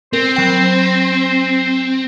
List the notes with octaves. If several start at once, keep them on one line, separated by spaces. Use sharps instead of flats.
C4 A#4 C5
F#3 G5